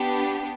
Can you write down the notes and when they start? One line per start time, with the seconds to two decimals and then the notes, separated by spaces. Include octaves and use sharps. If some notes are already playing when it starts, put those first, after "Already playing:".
Already playing: B3 D4 G4